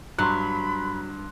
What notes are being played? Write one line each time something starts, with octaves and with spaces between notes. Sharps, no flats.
G2 F#3 B5 C6 F#6